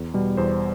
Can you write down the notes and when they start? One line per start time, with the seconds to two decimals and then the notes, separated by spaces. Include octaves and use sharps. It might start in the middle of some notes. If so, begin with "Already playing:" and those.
Already playing: E2
0.14 B2 G3
0.37 E2 C5